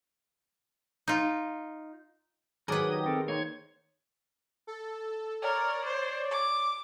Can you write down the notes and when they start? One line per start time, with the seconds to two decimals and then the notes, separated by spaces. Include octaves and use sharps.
1.08 D#4 F4
2.68 D#3 F#3 G#4 A#4 B4 D5 F#5 D#6
2.93 G4 D#5
3.06 C4 A4 A#4
3.28 A#3 D#4 C5 C#5 G#6
4.67 A4
5.42 A#4 C#5 D5
5.85 C5
6.31 D6